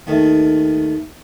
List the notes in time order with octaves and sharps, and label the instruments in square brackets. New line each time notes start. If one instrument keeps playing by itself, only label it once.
[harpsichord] D#2 D#3 A3